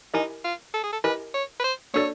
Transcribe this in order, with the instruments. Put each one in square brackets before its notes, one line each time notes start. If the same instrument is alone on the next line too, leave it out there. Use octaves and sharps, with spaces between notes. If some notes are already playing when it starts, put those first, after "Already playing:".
[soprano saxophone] D#4 [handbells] E4 G4 A#4 D#5 G#5
[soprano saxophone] F4
A4
G#4
A4
[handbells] E4 G4 A#4 D#5 G#5 [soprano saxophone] B4
[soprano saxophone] C#5
B4
C5
[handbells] A#3 D4 F#4 A4 D5 [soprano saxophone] C#5